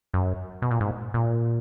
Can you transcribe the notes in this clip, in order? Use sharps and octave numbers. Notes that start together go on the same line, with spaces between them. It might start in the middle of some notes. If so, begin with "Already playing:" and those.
F#2
B2
A#2
G#2
A#2